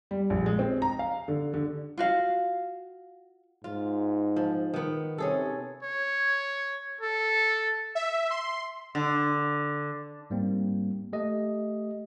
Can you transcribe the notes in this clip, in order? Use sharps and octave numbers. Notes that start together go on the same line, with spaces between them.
G3
A#1
G#3
C4
A#5
F5
D3
D3
F4 F#4 F5
G#2 F4
F3
D#3 B3
C3 C#4 G#4 A4
C#5
A4
E5
C6
D3
G#2 G3 A#3 C4
A3 G4 D#5